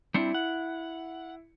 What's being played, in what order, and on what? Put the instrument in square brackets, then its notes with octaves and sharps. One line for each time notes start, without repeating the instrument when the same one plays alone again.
[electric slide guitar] G3 C4 D4 [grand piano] E4 C#7
[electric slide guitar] F#5